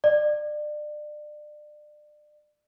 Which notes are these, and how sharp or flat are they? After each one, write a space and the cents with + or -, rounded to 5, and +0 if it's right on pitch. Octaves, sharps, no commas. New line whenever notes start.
D5 +30